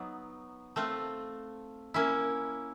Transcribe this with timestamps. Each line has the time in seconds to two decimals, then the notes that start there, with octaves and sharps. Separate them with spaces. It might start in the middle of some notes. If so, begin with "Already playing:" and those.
Already playing: F#3 B3 D#4
0.76 A3 C4 F4
1.94 A#3 C#4 E4